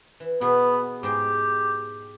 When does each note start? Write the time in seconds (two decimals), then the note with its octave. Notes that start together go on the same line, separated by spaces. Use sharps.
0.20 E3
0.41 B2 B3 G#4
1.03 G#2 G4 G#4 G5